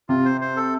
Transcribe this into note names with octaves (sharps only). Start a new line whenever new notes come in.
C3 F4
C5
C5
A4